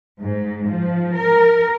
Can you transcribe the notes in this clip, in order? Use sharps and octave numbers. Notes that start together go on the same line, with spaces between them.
G#2
F3
A#4